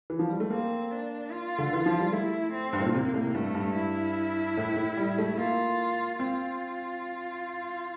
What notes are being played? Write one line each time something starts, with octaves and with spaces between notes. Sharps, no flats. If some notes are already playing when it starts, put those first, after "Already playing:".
E3
F3
G3
A3
A#3 C4
D4
F4
D3
E3
F3
G3
A3 E4
C4
G2
A2
A#2
C3 A#3
A2
G2 A3
G2
E4
A2
A2
G3
A3
A#3 F4
C4 F4